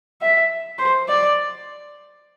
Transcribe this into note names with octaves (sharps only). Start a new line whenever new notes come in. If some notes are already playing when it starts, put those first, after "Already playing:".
E5
C5
D5